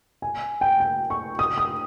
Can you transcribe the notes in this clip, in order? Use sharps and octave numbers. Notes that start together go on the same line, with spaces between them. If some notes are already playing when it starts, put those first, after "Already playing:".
G#5
G5
G5
C#6
D#6
D#6